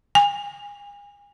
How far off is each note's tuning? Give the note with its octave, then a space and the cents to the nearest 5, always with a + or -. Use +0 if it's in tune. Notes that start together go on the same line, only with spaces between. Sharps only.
G#5 -35